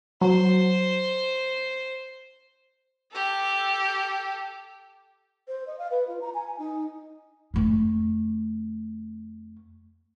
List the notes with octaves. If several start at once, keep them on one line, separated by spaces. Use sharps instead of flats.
F#3 C5
G4 A4
C5
D#5
F5
B4
F4
A#5
G#5
D#4
F2 A3